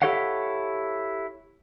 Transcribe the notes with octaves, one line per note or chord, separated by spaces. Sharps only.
E4 G4 A4 C#5 F5 F#5